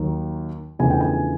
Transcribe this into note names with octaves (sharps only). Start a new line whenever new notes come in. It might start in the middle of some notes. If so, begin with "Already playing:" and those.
Already playing: D#2 D#3 F#3
E2 C#3 F3 A3 D4 G#5
G5
G#5